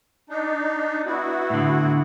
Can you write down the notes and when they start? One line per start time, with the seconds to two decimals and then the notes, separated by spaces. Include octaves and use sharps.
0.30 D4 D#4
1.06 B3 E4 F#4
1.50 A2 D3